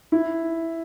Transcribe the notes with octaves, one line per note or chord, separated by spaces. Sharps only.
E4